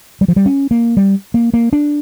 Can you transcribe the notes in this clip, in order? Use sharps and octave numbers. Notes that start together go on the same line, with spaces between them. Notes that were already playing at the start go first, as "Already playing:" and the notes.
G3
F3
G3
C#4
A#3
G3
A#3
A#3
D4